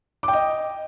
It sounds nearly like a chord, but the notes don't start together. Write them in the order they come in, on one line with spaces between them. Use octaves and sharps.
D6 G5 D#5